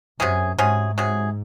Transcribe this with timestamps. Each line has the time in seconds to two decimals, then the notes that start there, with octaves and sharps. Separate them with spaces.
0.19 F#2 C3 F#3 C#4 G#4
0.58 G#2 C3 F#3 C#4 G#4
0.98 C3 F#3 C#4 G#4